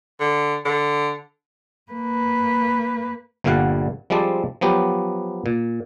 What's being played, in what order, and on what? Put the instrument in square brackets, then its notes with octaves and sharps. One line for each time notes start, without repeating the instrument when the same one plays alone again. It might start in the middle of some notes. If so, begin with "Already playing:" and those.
[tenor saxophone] D3
D3
[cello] A#3 B4
[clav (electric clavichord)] G1 A#2 D3 G3 F5 F#5
F3 G3 G#3 C4 D5 A5
F3 F#3 B3 G4
A#2